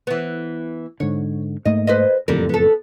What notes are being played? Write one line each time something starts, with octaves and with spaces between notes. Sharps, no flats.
E3 B3
G#2 D3 C#5
G#2 A3 A#3 D#5
B4 C5 D#5
F#1 F2 A2 D3 G3 A#4
B3 A4